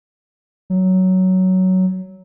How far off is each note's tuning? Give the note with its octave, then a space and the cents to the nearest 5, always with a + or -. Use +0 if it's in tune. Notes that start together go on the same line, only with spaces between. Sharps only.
F#3 +10